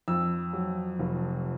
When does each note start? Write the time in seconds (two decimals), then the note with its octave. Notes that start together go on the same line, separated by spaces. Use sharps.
0.08 F2 E6
0.53 F#3
0.99 F1